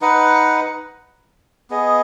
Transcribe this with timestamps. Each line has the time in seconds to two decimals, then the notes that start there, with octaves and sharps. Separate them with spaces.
0.02 D#4 B4 D#5 F#5
1.70 B3 G#4 D#5